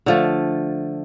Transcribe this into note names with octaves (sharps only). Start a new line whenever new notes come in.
D3 F3 A3